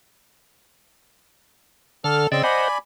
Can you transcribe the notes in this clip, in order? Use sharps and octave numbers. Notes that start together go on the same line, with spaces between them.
D3 A4 F6
C#3 C4 D5 D#5 E6
C5 D5 D#5 F#5 G#5 B5